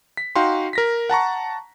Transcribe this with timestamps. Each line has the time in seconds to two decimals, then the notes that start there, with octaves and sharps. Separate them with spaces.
0.17 B6
0.36 D#4 F#4 F5 G5 C6
0.73 A#4 A#6 B6
1.10 F#5 A5 A#5 C#6